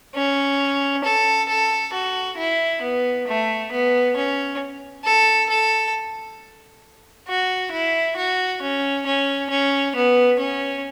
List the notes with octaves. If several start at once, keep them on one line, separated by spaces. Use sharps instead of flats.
C#4
A4
A4
F#4
E4
B3
A3
B3
C#4
A4
A4
F#4
E4
F#4
C#4
C#4
C#4
B3
C#4